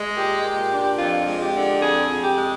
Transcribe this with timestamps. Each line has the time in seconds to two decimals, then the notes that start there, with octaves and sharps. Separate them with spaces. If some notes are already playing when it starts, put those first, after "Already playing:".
Already playing: G#3
0.16 A#2 G4
0.44 A#2
0.71 D4
0.98 F2 F4
1.26 G#3
1.40 G4
1.54 D3
1.81 F2 G#4
2.09 F2
2.23 G4
2.36 G#3